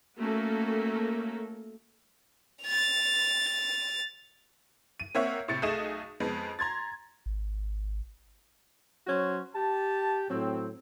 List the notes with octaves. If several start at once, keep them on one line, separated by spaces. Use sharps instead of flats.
A3 A#3 C#4 F#4 A4 A#4
A6 F7
D#7
A#3 C4 C#5 E5 F#5
A2 C3 A6 C#7
B1 A3 G#4 D#5 E7
F2 G#3 B3
A#5 C6 G#6 A6
G#1
F#3 C#4 F#4 C5
G4 A5
A2 F#3 C4